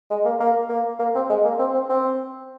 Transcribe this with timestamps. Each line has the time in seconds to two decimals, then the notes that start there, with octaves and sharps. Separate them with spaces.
0.10 G#3
0.25 A#3
0.40 A#3
0.69 A#3
0.99 A#3
1.15 C4
1.29 G#3
1.44 A#3
1.59 C4
1.74 C4
1.89 C4